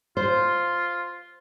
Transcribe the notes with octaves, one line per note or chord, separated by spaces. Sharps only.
F4 C5